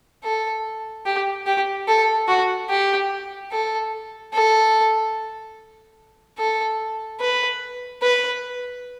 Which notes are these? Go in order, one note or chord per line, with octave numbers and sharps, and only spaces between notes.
A4
G4
G4
A4
F#4
G4
A4
A4
A4
B4
B4